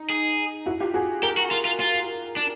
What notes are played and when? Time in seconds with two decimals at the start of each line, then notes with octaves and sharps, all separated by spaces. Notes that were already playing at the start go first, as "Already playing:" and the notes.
Already playing: D#4
0.10 G#4
0.66 E4 F#4
0.80 F4 G4
0.94 F#4 G#4
1.22 G4 G#4 A#4
1.37 F#4
1.51 F4
1.65 F4
1.80 F4
2.36 D4